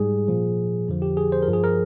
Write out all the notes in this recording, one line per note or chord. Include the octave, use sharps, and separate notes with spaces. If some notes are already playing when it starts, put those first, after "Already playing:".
Already playing: G#2 G3 G#4
A#2 F3
F2 D3 F3
G4
G#4
C5
A#4
G2 F3
G#4
A#4